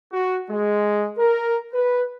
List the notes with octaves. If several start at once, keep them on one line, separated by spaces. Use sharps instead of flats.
F#4
G#3
A#4
B4